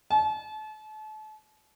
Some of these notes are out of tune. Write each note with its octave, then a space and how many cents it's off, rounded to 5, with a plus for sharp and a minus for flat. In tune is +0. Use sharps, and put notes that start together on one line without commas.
A5 -35